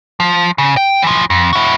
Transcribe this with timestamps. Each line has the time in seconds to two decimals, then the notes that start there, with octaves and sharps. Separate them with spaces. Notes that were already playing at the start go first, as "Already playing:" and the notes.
0.20 F3
0.58 C#3
0.77 G5
1.02 E3 F3
1.30 F2
1.53 E4 F#4